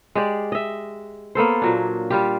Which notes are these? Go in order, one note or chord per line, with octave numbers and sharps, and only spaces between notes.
G#3 G4 D5
D#5 E5
A#3 B3 A4 C5
A#2 F#3 D4
G3 F4 G4